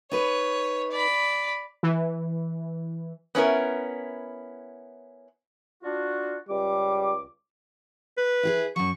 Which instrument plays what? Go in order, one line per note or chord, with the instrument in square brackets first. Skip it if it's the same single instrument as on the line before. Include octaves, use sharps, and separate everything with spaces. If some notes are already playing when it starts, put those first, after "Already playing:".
[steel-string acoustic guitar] D#4 B4 [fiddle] C#5
[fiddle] D5 B5
[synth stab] E3
[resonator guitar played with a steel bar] B3 C#4 E4 A#4
[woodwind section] D4 F4 F#4
[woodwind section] C#2 D6 [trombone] G3
[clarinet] B4
[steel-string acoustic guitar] E4 G4 G#4
[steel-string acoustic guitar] F#2 F#3 [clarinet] C#6